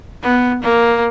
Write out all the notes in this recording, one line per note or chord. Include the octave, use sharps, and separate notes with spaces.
B3
A#3